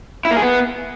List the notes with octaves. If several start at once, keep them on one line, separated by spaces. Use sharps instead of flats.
E4
A#3
G#4
B3